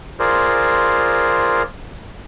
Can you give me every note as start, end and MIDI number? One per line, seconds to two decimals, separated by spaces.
0.19 1.63 65
0.19 1.63 68
0.19 1.63 70
0.19 1.63 72
0.19 1.63 74